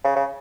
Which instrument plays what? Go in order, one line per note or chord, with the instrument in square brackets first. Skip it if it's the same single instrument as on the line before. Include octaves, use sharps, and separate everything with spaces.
[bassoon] C#3
C#3